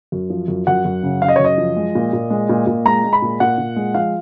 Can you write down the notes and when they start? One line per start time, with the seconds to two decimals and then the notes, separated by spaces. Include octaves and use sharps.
0.12 F#2
0.30 F3
0.48 F#2
0.67 F#2 F#5
0.85 F#2
1.03 C#3
1.22 C#3 F5
1.28 D#5
1.36 C#5
1.39 F#2
1.44 D#5
1.58 F3
1.77 G#3
1.95 A#2
2.13 A#2
2.30 G#3
2.49 A#2
2.67 A#2
2.85 G#3 A#5
3.04 G#3
3.13 B5
3.22 A#2
3.40 A#2 F#5
3.58 A#2
3.76 G#3
3.94 F3 F5